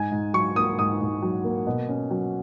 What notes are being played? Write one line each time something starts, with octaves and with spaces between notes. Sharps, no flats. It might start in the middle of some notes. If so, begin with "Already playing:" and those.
Already playing: G#2 G#5
G#2
F#3 C#6
A#3 D#6
G#2 D#6
G#2
F#3
A#3
B2
C#4
F#3